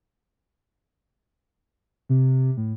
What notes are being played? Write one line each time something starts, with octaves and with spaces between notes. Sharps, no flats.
C3
A2